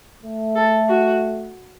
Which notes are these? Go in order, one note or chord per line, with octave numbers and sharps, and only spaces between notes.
A3
A4
F#4